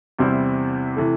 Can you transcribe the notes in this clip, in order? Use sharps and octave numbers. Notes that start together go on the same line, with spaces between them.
E2 C3 G3 C4 E4
C3 E3 A3